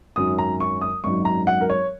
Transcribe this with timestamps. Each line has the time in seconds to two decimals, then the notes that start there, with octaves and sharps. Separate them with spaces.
0.16 G#1 F#2 D#3 F#3 C#4 D#6
0.38 A#5
0.60 C#6
0.81 D#6
1.04 G#1 F#2 F#3 D#4 C#6
1.25 A#5
1.47 F#5
1.61 A#4
1.70 C#5